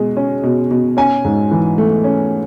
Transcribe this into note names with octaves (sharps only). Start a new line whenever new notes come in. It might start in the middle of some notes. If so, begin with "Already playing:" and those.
Already playing: B2 G#3
C#4
B2
B2
C#4 G#5
G#2
E3
A3
C#4